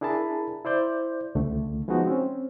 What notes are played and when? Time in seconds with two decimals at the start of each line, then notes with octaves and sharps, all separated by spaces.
0.01 D4 E4 G#4 A#4 A5 B5
0.65 E4 C5 D5 G6
1.35 C#2 D3 A3
1.88 F3 G#3 B3 D#4 F#4
2.07 C4 C#4